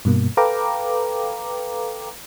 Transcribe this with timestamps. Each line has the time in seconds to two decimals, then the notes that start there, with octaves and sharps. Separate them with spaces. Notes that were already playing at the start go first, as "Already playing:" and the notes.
0.05 G2 B2 A#3
0.37 A4 B4 F5 G5 A#5 D6